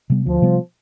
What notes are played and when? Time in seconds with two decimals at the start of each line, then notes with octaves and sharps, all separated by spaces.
0.10 C3 G3 B3
0.26 D2 F3
0.42 C3 G3 B3